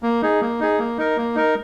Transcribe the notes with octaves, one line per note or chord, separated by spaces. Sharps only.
A#3
D#4 G#4
A#3
D#4 G#4
A#3
D#4 A#4
A#3
D#4 A#4